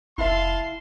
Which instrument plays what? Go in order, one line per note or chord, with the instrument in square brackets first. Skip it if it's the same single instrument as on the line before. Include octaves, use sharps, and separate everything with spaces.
[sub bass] F1 [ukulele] E4 E5 [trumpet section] F5 A5 C6